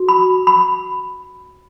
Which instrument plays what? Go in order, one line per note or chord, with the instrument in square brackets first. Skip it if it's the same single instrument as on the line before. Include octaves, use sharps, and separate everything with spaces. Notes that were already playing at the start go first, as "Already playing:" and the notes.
Already playing: [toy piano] F#4
B5
B5